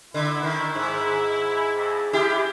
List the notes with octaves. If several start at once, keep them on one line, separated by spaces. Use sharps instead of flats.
D3 E4
D#3
G#2
F2
G#3 E4 G4